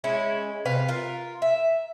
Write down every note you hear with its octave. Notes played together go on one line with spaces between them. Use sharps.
G#3 C#4 E4
C3 B4 F5
F4 A#4
E5